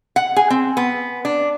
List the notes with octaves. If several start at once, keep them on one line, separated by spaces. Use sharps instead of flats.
F#5
G#4
C4
B3
D4